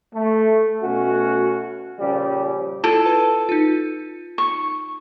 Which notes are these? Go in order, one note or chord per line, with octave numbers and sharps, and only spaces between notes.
A3
B2 A3 C#4 F#4
A#2 C#3 F3 G3
E4 F4 A4
B4 A5
D#4 F4
C#6